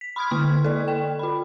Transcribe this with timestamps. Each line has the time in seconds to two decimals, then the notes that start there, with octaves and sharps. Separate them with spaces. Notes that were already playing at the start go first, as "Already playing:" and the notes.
0.01 B6
0.16 B5 C6 D#6 F6 G#6
0.30 D3 A#3 C#6 F6
0.64 A4 D5
0.88 G5
1.19 F4 B5